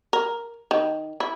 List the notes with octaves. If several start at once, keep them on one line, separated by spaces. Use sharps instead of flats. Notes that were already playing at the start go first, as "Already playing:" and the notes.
A#4
D#3
E4